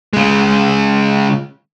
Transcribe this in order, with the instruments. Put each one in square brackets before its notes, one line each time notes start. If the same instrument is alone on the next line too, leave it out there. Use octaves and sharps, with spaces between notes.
[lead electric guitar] C#3 G#3